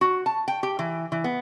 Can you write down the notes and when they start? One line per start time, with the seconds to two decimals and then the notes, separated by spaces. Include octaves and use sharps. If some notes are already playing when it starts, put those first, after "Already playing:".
0.01 F#4
0.26 A5
0.48 G5
0.63 G4
0.79 E3
1.12 E3
1.24 B3